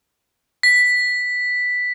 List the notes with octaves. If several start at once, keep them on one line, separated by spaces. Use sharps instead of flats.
B6